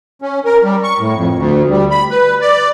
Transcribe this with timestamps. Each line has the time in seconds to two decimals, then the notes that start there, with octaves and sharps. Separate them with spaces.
0.22 C#4
0.45 A#4
0.63 G3
0.84 C#6
0.99 A2
1.16 F2
1.36 D2
1.70 G3
1.91 B5
2.11 B4
2.41 D5